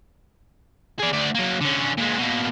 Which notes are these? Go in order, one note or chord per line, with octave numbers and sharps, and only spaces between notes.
G#4 D5
D2 D5
F#3 A#3
D3 C#4
A#2 G#3
B2 A#3